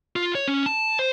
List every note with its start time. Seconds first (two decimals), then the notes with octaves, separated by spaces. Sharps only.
0.16 F4
0.35 C#5
0.48 C#4
0.66 A5
0.99 C5